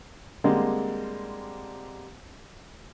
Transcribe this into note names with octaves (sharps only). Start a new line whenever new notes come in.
D3 G3 G#3 A#3 C4